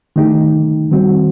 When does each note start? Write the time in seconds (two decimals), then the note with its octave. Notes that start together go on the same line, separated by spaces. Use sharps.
0.16 D#3 A3 D#4 G4
0.91 D#3 G3 C4 F#4